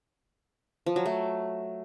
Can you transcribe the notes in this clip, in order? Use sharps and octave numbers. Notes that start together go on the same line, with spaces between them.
F3
F#3
A3